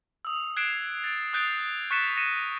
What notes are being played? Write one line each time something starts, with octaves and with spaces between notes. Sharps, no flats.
D#6 E6
F#6 G#6 C7 D7 E7
A6 D7
D#6 F#6 G6 A6 C7 D7
C#6 F#6 A6 B6 C#7 E7
A#6 C#7 D#7 E7